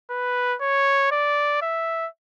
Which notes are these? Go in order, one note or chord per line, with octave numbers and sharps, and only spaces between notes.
B4
C#5
D5
E5